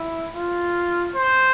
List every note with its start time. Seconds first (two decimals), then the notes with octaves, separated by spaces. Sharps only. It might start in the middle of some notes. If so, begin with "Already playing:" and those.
Already playing: E4
0.36 F4
1.15 C5